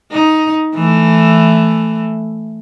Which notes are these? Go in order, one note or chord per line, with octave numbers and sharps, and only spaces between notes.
D#4
E3 A3